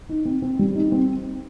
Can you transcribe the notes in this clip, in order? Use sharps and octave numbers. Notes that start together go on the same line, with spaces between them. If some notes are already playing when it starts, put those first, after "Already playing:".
D#4
C4
C4
G3
D#4
C4